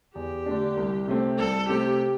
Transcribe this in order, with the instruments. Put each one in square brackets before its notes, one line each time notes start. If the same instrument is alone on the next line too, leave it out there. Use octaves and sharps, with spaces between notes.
[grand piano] E2 [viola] G4
[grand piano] D3 A3 D4
C2
C3 A3 C4
[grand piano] C2 [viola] A4
[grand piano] C3 A3 C4 [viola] G4